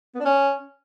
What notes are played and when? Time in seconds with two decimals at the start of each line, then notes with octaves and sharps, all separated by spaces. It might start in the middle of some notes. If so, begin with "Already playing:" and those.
0.15 B3
0.20 D4
0.25 C#4